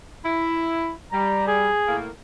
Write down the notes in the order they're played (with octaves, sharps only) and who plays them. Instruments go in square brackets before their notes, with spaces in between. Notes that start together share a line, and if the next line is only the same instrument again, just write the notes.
[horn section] E4
[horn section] G3 [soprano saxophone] A#5
[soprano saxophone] G#4
[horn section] A2 A#3